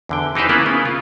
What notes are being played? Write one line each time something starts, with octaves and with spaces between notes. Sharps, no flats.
E2 D3 G5
E3 D#4 G4 B4 C5
C#3 A#3 B3 E4 A#4 B4
C#3 B3
F4